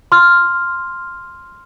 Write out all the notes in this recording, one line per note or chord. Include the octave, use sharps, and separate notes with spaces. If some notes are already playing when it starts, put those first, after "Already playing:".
C6 F6